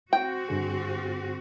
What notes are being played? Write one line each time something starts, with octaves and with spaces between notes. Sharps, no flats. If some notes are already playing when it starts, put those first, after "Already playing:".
C4 F#4 G5
G2 D3 G#4